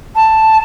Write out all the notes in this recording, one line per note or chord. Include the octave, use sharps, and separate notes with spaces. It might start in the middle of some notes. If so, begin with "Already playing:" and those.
A5